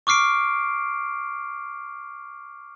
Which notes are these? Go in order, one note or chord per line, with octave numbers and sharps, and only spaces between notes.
C#6 D6 F6 C7 D7